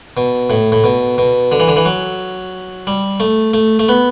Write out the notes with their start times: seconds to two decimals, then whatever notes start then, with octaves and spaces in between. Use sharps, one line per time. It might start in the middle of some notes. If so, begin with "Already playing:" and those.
0.17 B2
0.50 A2
0.72 A2
0.84 B2
1.18 B2
1.52 D3
1.60 E3
1.68 D3
1.76 E3
1.86 F#3
2.87 G3
3.20 A3
3.54 A3
3.79 A3
3.89 B3